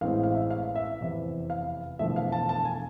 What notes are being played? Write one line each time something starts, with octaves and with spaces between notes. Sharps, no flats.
A1 A2 G#3 C4 F5
F5
E5
F5
E5
F1 E2 C3
F5
E1 E2 D3 F3 A3 E5
F5
A5
A5
G#5